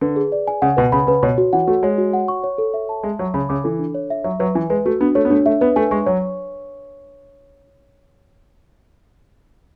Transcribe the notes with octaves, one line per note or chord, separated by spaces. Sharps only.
D3 B4
G#4
D5
G#5
C#3 F#5
B2 B4
C#3 B5
C#3 B4
B2 C#5
F#4
E3 F#5
A3 F#4
G#3 C#5
F#4
F#5
C#6
C#5
A4
E5
A5
G#3 E5
F#3 C#5
C#3 B5
C#3 D6
E3 A4
D4
C#5
E5
F#3 E5
F#3 B4
E3 G#5
G#3 B4
A3 F#4
B3 D4
A3 C#5
B3
A3 D4
A3 E5
B3 B4
A3 G#5
G#3 C#6
F#3 C#5